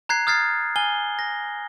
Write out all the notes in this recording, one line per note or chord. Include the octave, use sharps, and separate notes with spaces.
A#5 F#6 G#6 C7
D#6 F6 G#6 A6 C7
G#5 F6 G7
A#6